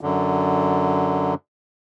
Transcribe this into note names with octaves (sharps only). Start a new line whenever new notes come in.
F#2 D3